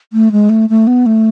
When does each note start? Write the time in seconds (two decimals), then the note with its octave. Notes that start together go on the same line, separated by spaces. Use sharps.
0.13 A3
0.32 G#3
0.49 A3
0.70 A3
0.87 B3
1.06 A3